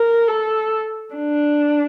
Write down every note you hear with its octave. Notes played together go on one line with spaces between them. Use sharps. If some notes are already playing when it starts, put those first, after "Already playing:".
Already playing: A#4
A4
D4